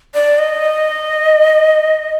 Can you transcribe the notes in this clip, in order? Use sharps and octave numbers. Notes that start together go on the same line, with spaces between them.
D5
D#5